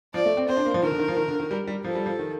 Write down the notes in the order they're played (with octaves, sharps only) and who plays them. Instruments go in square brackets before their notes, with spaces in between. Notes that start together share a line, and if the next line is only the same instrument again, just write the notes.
[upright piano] F3 [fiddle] D5
[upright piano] A3
C4
[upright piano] C4 [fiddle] C5
[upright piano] D4
A#3
F3
[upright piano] D#3 [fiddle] A#4
[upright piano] D3
D#3
F3
D#3
D3
D#3
G3
G3
[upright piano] F3 [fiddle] A4
[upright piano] G3
F3
D#3